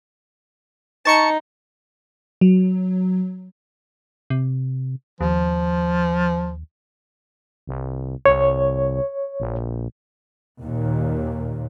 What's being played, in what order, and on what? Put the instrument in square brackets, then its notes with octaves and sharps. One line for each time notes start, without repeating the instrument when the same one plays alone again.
[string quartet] D#4 [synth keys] A5 C#6 C#7
[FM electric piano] F#3
[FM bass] C3
[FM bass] D#2 [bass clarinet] F3
[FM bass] C2
[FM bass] C2 [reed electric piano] C#5
[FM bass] A#1
[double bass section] D#2 A#2